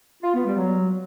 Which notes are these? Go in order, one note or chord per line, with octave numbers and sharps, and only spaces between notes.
F4
B3
G3
F#3